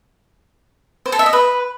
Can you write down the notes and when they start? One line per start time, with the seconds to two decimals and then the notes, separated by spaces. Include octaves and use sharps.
1.06 C5
1.12 A4
1.19 E5
1.26 D#5
1.33 B4